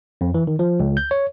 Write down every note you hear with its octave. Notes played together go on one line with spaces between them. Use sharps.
F2
E3
D#3
F3
C#2
G6
C#5